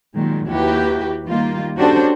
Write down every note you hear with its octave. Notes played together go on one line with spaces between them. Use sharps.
A#2 D#3 F#3 G#3
D#2 E4 F#4 G4 B4
D#3 G3 A#3 F4
C#4 D4 F#4 G4 A4 C5